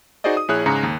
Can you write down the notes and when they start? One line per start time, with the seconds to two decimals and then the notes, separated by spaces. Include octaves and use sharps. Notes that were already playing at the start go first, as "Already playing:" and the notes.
0.24 D#4 F#4 G#4 C5 D5 D#5
0.37 D#6
0.48 A#1 E4 G#4 C#5 F#6
0.66 G#2 C#3 G#4 A#5 C#7
0.83 D#2